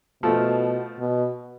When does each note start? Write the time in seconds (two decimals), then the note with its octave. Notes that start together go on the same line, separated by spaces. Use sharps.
0.23 B2 F3 A3
0.99 B2